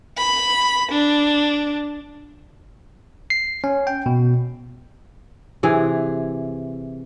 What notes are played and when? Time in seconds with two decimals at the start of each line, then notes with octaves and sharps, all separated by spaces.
0.17 B5
0.92 D4
3.30 C7
3.64 C#4
3.87 G5
4.06 B2
5.63 C3 E3 G#4